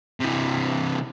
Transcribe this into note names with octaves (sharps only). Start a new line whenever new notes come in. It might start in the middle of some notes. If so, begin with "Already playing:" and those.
C3 E3